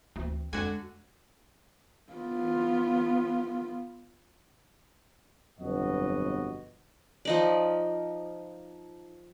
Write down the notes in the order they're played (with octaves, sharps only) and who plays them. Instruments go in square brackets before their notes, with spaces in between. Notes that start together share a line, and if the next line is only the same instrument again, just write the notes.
[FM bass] D2 [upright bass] E3 C4
[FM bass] F2 [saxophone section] D3 [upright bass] G#3 [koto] F#4 G#5
[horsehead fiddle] B3 F4
[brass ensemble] G1 F2 B2 F#3 F#4 D#5
[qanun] F3 D#4 D5